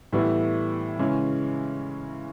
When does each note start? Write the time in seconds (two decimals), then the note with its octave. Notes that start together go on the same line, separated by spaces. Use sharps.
0.12 A2 E3 G3 B3 E4
0.99 C#3 E3 G#3 C#4